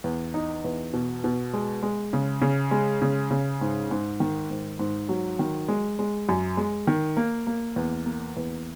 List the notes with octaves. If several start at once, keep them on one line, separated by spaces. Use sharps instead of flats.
E2
D#4
E2
B2
B2
G#3
G#3
C#3
C#3
G#3
C#3
C#3
G#2
G#2
D#3
G#2
G#2
F#3
D#3
G#3
G#3
F#2
G#3
D#3
A#3
A#3
E2
A#3
E2